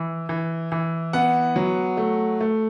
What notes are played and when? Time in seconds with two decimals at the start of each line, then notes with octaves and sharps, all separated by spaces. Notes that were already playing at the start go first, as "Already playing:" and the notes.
Already playing: E3
0.29 E3
0.72 E3
1.13 B3 F#5
1.56 F#3
1.97 A3
2.41 A3